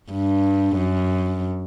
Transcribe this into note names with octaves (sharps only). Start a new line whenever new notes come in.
G2
F#2